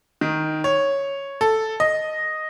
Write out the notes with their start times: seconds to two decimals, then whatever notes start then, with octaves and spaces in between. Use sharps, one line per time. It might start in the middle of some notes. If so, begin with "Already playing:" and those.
0.21 D#3
0.64 C#5
1.41 A4
1.80 D#5